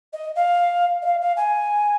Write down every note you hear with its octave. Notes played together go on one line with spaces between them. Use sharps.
D#5
F5
D#5
F5
F5
G#5